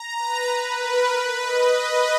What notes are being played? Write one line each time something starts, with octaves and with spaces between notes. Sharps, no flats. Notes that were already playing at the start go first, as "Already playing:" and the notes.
Already playing: A#5
B4
A#4
B4
D#5